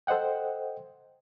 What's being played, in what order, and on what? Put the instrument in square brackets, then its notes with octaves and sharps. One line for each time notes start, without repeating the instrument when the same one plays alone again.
[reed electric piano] A4 C5 D#5 F#5 G5